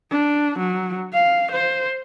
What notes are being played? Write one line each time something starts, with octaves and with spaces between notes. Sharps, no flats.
D4
F#3
F5
C5